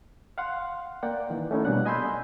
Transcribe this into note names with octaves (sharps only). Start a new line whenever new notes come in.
F5 F#5 C6
A#3 D5 F#5 G5
D#3 E3
A3 C#4 D#4 E4
B2 G3 A#3 D4 F#5 F#6
D#5 G#5 B5 C6 E6 G6